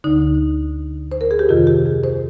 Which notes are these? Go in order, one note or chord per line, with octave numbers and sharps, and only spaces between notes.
D2 D3 D#4
C5
A#4
G#4
G4
F2 C3 D#3 F4
G4
G#4
C5